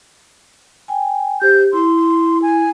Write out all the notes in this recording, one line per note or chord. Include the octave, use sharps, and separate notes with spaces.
G5 G#5
G4 C5 G6
E4 C6
G#5